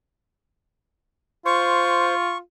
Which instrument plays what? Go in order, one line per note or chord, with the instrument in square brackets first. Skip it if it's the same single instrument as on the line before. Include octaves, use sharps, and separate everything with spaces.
[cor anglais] F4 [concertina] C5 [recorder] C#6